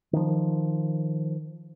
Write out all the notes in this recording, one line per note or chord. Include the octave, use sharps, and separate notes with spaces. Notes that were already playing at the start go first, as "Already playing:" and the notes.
D#3 F3